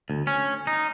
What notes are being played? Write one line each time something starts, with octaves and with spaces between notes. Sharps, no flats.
D2
C#4
D#4